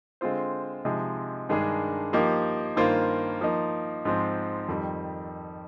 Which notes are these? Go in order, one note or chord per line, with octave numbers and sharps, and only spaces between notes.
D3 G#3 C4 F4 C5
C3 F3 G#3 D#4
G2 D#3 G#3 D4 G#4
F3 A#3 D#4 G4
G2 D#3 A#3 F4 C5
F3 A#3 D#4
G#2 F3 G#3 C4
F2 D#3 G3